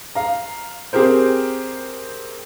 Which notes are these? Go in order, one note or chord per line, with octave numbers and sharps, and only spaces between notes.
F5 A#5
C4 G4 G#4 A#4 C5